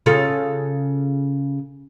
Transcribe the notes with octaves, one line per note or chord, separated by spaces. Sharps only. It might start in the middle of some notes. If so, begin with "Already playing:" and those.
C#3 F4 A4